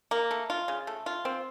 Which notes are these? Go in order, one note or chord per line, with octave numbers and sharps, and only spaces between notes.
A#3
A3
F4
C#3
A3
F4
C4